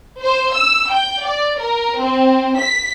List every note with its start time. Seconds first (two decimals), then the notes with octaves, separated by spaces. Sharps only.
0.20 C5
0.53 E6
0.91 G5
1.24 D5
1.59 A#4
2.00 C4
2.57 B6